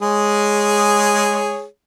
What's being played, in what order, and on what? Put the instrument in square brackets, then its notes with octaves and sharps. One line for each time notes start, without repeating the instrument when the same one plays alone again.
[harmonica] G#3 G#4 C#5